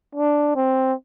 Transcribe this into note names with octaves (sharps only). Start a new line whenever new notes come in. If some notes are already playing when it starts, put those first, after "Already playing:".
D4
C4